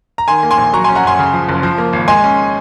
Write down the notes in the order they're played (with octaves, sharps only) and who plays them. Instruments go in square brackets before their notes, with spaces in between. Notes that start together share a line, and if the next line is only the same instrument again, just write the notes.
[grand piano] A#5
D#3 G#5 C6
A#3
G#5 C6
A#1
F#3 A#5 C#6
C#4 G#5 C6
F#5 A#5
F#2 G#5 C6
C#3
F3
F#1
F3
A#3
G#1
G#3 G#5 C6
C#4